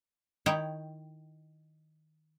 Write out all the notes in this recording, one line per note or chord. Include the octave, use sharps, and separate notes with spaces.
D#3 E4 C#5 G5